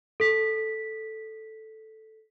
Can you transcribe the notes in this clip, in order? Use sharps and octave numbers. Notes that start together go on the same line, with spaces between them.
A4 B6